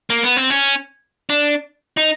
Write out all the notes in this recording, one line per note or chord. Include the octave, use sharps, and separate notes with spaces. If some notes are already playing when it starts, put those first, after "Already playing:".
A#3
B3
C4
C#4
D4
D#4